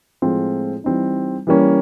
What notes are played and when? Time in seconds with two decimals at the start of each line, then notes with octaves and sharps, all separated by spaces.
0.22 A2 F3 G#3 C4 F4
0.84 E3 G3 C4 D#4
1.47 E3 G3 A#3 C#4